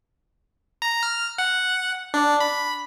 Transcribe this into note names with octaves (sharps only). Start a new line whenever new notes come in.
A#5
F6
F#5
D4
B5